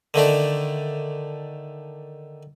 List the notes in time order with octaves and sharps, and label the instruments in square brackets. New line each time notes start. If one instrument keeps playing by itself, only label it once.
[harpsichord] D3 D#3 A3 D4